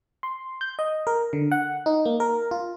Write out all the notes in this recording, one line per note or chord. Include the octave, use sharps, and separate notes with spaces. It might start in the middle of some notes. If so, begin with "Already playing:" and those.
C6
G6
D#5
A#4
D3
F#5
D#4
A#3
A#4
F4